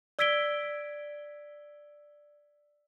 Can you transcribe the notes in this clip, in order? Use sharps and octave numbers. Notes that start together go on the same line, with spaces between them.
D5 E6 G#6 B6 D7 G7